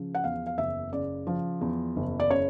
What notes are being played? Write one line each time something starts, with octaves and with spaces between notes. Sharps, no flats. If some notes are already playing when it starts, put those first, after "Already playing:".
Already playing: C#3 F3
F#5
E2 F5
F5
F#1 E5
C#3 D5
F3
E2
F#1
D5
C#3 C#5